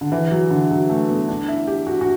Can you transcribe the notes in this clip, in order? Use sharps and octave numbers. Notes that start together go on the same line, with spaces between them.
D3
E3
F#3
D3
F#3
A3
B3
D4
E4
G4
F#4
F#4